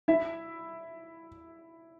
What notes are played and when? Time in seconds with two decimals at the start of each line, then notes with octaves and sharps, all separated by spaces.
0.08 E4 E5